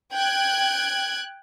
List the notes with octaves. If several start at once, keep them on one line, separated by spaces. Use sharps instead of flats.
G5 F#6 G#6